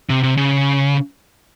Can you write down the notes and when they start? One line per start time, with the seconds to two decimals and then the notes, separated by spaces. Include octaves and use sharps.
0.09 C3
0.23 C3
0.37 C#3